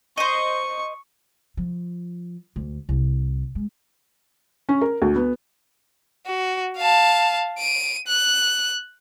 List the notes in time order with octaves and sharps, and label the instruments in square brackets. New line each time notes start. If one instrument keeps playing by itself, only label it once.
[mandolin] C5 D#5 [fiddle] C#6
[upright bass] F3
D2
C2
G#3
[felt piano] C#4
A#4
D2
B3
[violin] F#4
F5 A5
D7 D#7
F#6